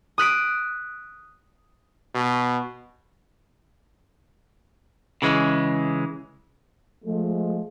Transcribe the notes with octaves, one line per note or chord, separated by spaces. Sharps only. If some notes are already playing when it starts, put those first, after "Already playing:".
D#6 F#6 B6 D7
B2
C#3 E3 G#3
F3 G#3 A3